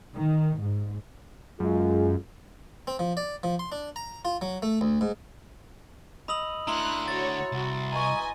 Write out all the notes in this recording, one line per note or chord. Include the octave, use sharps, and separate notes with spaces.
D#3
G#2
F#2 G#3 F4 G#4
C4
F3
D5
F3
C6
D4
A#5
F4
F#3
A3
D2
G#2
D#5 B5 E6 F#7
D3 A3 E4 A#5 C6 F6 F#6
F#4 C#5 A6
C2 F#4
B4 D#5 G#5 A#5 C#6